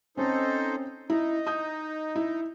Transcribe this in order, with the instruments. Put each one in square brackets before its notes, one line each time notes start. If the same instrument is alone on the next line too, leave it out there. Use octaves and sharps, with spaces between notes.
[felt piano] C4 C#4 [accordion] D#4 A4 C5
[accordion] D#4 [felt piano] E4
[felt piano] D#6 G6
E4